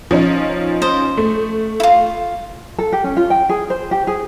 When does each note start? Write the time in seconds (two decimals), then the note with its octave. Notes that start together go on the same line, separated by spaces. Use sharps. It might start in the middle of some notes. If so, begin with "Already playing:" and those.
0.11 F3 C#4 D#4
0.82 C5 D#5
1.17 A3
1.80 E4 F4
2.79 A4
2.93 G4
3.04 C#4
3.17 F4
3.30 G5
3.49 G#4
3.70 C5
3.91 G4
4.07 G#4